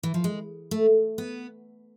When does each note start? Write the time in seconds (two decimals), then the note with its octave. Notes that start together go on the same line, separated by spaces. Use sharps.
0.03 E3
0.14 F3
0.24 G#3
0.71 A3
1.18 B3